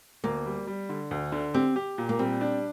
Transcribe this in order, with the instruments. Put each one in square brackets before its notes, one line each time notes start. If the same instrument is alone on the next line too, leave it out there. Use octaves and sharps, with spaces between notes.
[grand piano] D2 [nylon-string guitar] A#3
[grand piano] G3
G3
D3
D2
D3
[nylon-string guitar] C4 [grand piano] G4
[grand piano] G4
A#2
[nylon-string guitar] A#3
[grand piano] G3 [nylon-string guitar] C4
[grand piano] D4